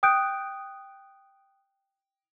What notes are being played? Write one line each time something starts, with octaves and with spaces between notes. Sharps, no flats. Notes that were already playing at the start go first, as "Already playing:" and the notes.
G5 D#6 F#6 G6 D7